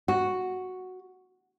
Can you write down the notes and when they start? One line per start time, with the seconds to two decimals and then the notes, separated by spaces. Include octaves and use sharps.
0.08 F#4